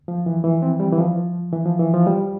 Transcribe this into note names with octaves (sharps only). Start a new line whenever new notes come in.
F3
E3
E3
C4
G3
E3
F3
E3
F3
E3
F3
G3